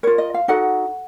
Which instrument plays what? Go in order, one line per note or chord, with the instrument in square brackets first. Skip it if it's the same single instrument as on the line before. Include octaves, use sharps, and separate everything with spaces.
[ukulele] F4 A#4 C#5
D#5
F5
D#4 F#4 A4 F#5